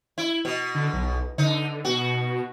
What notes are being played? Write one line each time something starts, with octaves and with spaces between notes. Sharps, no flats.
E4
B2
D3
B1
D3 D#4
B2 F#4